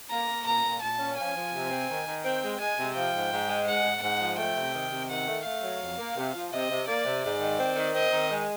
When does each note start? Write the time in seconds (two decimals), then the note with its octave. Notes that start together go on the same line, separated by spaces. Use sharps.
0.10 A#3 A#5
0.29 A#3
0.46 A#2 A#5
0.64 A#2
0.81 A#2 A5
0.99 C#4
1.17 F3 G#5
1.36 F3
1.53 C3
1.70 C4
1.88 D#3
2.07 D#3
2.24 C4 G5
2.43 G#3
2.60 G#3 G#5
2.78 C3
2.96 F3 G5
3.14 G#2
3.32 G#2
3.49 G#3
3.67 G#2 F#5
3.84 G#2
4.02 G#2 F#5
4.21 F3
4.38 A3 G5
4.57 C3
4.74 D#3
4.91 C3
5.10 D#3 F#5
5.28 A3
5.45 A3 F5
5.63 F#3
5.81 F2
5.98 A#3
6.16 C3
6.34 F3
6.51 C3 D#5
6.70 C3
6.87 A#3 D5
7.05 C3
7.24 G#2 D5
7.41 D#3
7.59 C4
7.76 D#3
7.95 C4 D#5
8.12 D#3
8.30 G#3